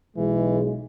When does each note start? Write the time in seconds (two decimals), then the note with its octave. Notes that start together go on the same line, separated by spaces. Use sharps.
0.17 B1 E3 G#3